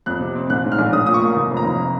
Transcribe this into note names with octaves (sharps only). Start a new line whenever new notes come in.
F2 F#6
C3
C4
A#1 F#6
G#2
F6
A#1
A#1 D#6
A#2 D#6
C#6
A#3
F1
F2
A#5
F1